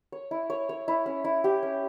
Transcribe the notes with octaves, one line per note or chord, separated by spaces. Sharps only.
C#5
E4
C#5
C#5
E4
C#4
E4
G4
C#4